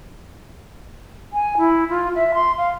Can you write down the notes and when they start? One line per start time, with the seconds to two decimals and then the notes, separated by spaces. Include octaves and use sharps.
1.33 G#5
1.58 E4
1.90 F4
2.15 E5
2.34 C6
2.58 F5